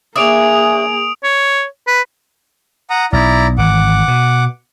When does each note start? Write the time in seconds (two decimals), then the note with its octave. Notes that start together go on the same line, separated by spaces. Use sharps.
0.16 A#3 D4 G#4 C#5 E5 D#6 D7 F7
1.24 C#5
1.87 B4
2.90 F#5 A#5 D#6
3.13 B1 E4 D5 A#5
3.58 G#1 E3 F#5 D6
4.08 B2